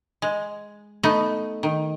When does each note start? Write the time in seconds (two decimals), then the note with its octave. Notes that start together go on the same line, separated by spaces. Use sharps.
0.22 G#3
1.03 A3 B3 D#4
1.63 D#3